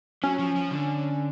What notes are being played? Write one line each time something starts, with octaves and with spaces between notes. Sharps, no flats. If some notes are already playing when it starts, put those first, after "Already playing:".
F#3 C#4
F3
F3
D3